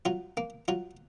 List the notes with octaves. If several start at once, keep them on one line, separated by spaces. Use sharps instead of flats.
F#3 F4
A#3
F#3 F4